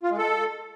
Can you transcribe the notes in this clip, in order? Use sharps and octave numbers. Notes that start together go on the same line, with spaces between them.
F4
G#3
A4